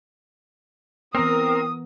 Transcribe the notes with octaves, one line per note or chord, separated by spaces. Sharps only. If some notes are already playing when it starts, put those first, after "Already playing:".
E3 B3 C4 A#4 D#6